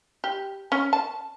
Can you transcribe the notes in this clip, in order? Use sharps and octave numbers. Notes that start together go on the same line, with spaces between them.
G4
C#4
A5